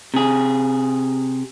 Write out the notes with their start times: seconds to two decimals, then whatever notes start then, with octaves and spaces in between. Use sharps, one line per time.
0.14 C3 G#4